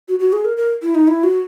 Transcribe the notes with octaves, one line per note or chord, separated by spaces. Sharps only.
F#4
F#4
G#4
A#4
A#4
E4
D#4
E4
F#4